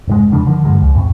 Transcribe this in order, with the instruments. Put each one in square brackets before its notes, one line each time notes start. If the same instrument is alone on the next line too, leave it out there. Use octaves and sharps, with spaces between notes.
[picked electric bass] F1 G#2 G#3
E1 C#3 F3 D4
D3 D#3 F3
G2 D3 F3 G#3
C#2
F2 A2